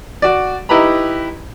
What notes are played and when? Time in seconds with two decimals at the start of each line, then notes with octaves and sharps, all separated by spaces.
0.22 F#4 D5
0.69 D#4 E4 G4 B4 A#5 B5